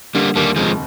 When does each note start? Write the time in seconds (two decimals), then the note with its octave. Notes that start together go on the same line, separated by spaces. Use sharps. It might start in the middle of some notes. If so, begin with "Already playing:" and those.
0.15 D3 G3 A#3
0.36 D#2 G3 A#3
0.56 F1 F3 G#3